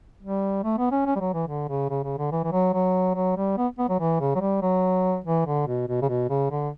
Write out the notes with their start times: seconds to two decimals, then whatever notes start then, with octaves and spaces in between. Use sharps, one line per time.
0.22 G3
0.64 A3
0.78 B3
0.92 C#4
1.06 C#4
1.15 G3
1.20 F#3
1.34 E3
1.48 D3
1.69 C#3
1.90 C#3
2.04 C#3
2.18 D3
2.32 E3
2.43 E3
2.52 F#3
2.74 F#3
3.15 F#3
3.37 G3
3.58 B3
3.78 B3
3.89 F#3
4.00 E3
4.20 C#3
4.35 F#3
4.41 G3
4.62 F#3
5.24 E3
5.45 D3
5.67 B2
5.88 B2
6.02 C#3
6.09 B2
6.29 C#3
6.51 D3